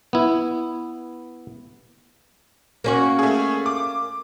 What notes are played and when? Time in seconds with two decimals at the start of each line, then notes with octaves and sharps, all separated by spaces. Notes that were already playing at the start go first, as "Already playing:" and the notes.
0.13 B3 E4
2.84 A#3 C#4 F#4
3.19 A3 G#4
3.66 D6